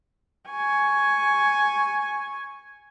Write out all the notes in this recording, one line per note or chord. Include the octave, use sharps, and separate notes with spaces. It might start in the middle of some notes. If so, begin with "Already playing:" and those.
G#5 C#6